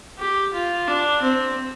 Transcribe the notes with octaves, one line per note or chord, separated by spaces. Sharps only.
G4
F4
D4
C4